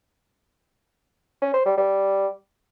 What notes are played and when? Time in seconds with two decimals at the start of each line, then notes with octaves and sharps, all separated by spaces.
1.42 C#4
1.54 C5
1.66 G3
1.77 G3